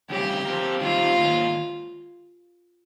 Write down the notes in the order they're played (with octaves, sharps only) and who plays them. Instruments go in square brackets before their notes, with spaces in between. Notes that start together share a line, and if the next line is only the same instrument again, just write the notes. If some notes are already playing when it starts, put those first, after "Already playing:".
[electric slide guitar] F2 C#3 G3 C#4 G#4 [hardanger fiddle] G4
[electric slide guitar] F3 C4 F4 A#4
[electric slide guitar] D#3 G3 C4 G4 A#4 [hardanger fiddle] F4
[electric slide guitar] G#2 D#3 A#3 C#4